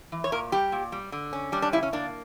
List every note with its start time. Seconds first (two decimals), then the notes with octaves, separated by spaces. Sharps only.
0.12 E3
0.24 C#5
0.32 A#2 A#4
0.52 G3 G4
0.72 A#2
0.92 G3
1.12 D3
1.33 C#4
1.52 G3 D4
1.62 D4
1.72 C#3 E4
1.83 C#4
1.93 A#3 D4